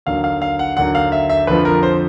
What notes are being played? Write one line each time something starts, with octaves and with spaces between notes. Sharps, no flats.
D#2 D3 F#3 F5
F5
F5
F#5
D#2 D3 F#3 F#5
F5
E5
E5
F2 D3 F3 B4
A#4
C5